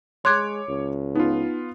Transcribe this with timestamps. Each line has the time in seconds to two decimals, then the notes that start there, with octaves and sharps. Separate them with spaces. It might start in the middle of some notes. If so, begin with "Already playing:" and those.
0.25 G#3 C#5 C6 D6 F#6 G#6
0.69 C#2
1.15 B3 D#4 F4